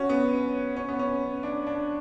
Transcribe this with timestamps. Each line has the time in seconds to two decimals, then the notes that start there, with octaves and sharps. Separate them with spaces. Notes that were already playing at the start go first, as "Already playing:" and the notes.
Already playing: C#4 F#4
0.09 B3
0.76 C#4
0.89 B3
0.99 C#4
1.43 D4
1.67 D4